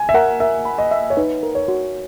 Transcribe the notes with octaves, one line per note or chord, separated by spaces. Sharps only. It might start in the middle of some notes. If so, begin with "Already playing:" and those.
Already playing: G#5
E5
A#4 F#5
A#4 E5
B5
D#5
E5
C#5
D#4 B4
A#4
C#5
F#4